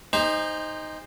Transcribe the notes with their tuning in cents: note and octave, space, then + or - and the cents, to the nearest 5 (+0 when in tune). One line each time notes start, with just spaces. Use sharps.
D#4 +0 G#4 -45 C5 +0